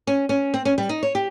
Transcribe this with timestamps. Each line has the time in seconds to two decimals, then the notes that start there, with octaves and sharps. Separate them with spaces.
0.07 C#4
0.29 C#4
0.54 C4
0.65 C#4
0.78 G3
0.89 D#4
1.03 C#5
1.15 G4